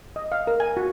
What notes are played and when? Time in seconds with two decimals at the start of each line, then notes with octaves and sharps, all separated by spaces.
0.16 D#5
0.32 F5
0.47 A#4
0.60 G#5
0.77 F#4